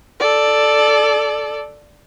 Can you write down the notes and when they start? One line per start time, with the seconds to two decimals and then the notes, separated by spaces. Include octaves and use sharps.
0.20 A4 D5